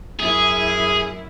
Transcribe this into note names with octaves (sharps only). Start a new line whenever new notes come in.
F#2 E4 G#4